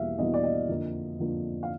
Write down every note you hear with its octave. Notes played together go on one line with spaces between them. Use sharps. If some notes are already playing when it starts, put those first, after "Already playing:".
Already playing: E2 B2 G3 A#3 E5 F5
E2 B2 G3 A#3 D#5
D5
D#5
F2 D3 F3 A#3
F2 D3 F3 A#3
F5